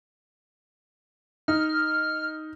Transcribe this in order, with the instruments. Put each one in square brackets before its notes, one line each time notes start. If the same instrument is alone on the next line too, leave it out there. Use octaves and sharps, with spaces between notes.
[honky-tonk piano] D#4 [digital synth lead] F6